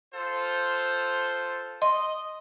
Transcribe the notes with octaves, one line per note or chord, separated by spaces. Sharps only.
F4 A4 C5
D#5 C6